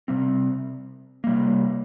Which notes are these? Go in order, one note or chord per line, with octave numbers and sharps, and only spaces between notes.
C3 G3 C4
C3 G3 A#3